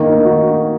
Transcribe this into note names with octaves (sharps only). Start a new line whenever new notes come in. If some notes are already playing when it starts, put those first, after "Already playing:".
Already playing: D#3 A#3
D#4
F#4